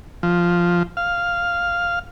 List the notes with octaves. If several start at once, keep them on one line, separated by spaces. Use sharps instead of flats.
F3
F5